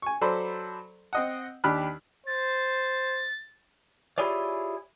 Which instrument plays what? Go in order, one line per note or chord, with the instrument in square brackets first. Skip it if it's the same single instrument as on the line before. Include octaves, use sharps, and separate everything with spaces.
[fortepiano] G#5 C#6
F#3 A4 C5 D5 B5 C6
C4 D#5 F#5
D#2 D4 G4 B5 F6 F#6
[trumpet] C5 [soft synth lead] A6
[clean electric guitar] E4 F4 G4 G#4 C#5 D5